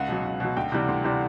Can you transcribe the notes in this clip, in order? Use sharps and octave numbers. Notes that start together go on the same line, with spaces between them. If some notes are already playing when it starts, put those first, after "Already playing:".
Already playing: C#2 F#5
B2 F#3
C#2
B2 F#3
D2 G5
C3 E3 G3
D2
C3 E3 G3